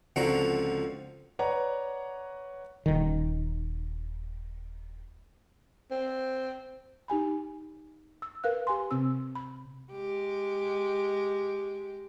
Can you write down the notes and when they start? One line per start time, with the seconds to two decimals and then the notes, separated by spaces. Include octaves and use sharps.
0.16 C#2 D3 F3 C4 F#4 A#5
1.39 B4 C#5 D5 F#5 A#5
2.86 D#1 D#3
5.91 C4
7.08 D#4 G4 G#5 B5
8.22 E6
8.44 A#4 B4 F5 F#6
8.67 G4 G#5 C6
8.91 C3 C4 E6
9.35 B5
9.92 G#3 G4